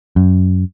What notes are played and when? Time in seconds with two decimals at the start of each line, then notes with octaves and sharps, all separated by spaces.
0.16 F#2